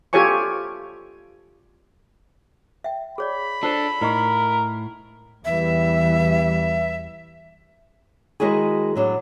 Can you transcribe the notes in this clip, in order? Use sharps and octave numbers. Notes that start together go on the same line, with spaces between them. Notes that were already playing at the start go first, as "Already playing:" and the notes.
F4 G4 A4 C#5 G#5 C#6
E5 G5
G#4 C#5 D5 B5
D4 F4 A4 C5 A5
A2 D#4 A#4 D#5 C#6
E2 E3 G3 E5
D#3 G#3 E4 F#4 G#4
A2 F#3 D4